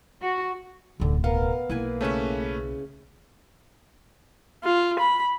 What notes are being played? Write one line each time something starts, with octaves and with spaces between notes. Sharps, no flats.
F#4
D1 B1 D3
B3 A#4 F5
B1 A#3 E4 B4 G#5
C#3 A3 C#4 B4 E5
F4
B5